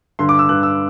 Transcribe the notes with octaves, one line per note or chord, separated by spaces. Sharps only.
G2 D3 C6
D6
E6
G2 D3 F#6
E6